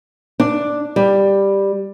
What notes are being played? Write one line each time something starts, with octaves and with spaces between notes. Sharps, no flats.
D4
G3